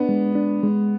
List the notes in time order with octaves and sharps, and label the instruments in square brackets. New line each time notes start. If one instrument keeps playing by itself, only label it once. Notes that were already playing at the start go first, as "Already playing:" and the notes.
Already playing: [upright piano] B3 [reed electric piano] D4
[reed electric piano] G#3
D4
G#3